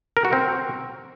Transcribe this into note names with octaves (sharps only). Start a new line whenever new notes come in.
A#4
F#4
C4